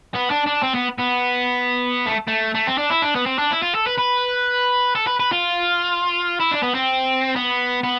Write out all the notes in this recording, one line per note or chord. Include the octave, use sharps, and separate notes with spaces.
B3
D4
D4
C4
B3
B3
A3
A3
A3
C4
D4
E4
D4
B3
C4
D4
E4
F4
A4
B4
B4
A4
B4
B4
F4
E4
D4
B3
C4
B3
B3